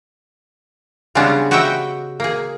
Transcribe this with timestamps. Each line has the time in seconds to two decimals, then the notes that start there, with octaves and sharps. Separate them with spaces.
1.15 C#3 G3 G#3 B3 C#4 D4
1.51 F#4 G4 B4 D#5 E5 G5
2.20 A#3 G#4